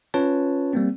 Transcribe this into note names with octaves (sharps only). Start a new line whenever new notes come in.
C#4 F4 B4 C#5 A5
G3 A#3 C4